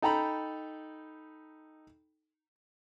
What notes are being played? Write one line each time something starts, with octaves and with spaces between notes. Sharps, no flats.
D#4 A4 G5 A#5 B5